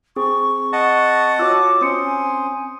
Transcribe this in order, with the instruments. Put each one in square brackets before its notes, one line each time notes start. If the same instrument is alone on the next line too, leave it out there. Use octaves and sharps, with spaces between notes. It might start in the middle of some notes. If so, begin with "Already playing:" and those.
[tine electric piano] C4 [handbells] G#4 [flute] C#6
[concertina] D#5 F#5 A5
[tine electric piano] F4 F#4 [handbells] C#5 E6 [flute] D6
[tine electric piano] C4 C#4 [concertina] C5 [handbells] D#6 C#7
[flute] G#5